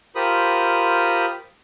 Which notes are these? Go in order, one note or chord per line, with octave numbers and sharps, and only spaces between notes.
F4 G4 A#4 C5 B5 D#6